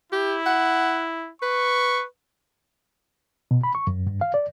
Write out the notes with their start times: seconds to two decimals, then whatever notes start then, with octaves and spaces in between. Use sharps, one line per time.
0.12 E4 G4
0.46 F#5
1.42 B4 C#6
3.51 B2
3.63 B5
3.75 C#6
3.87 F#2
4.07 G2
4.21 F5
4.34 D5